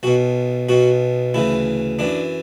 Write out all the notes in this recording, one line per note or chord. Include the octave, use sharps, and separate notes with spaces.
B1 B2 F#4
B1 B2 F#4
D2 C#3 E3 E4
F#2 E3 D4